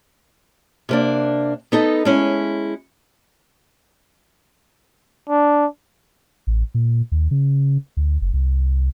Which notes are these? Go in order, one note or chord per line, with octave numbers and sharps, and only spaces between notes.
C3 A#3 D4
B3 D#4 A4 B4
G#3 C#4 E4
D4
A1
A#2
D#2
C#3
D2
F#1
C2